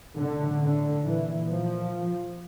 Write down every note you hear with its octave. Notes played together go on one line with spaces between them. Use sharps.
A2 D3
D3
A#2 E3
F3